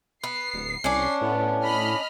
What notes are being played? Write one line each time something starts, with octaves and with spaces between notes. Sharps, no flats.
B3 C7
D1
C2 C#4 D4
A2 B3
D#5 B5 F6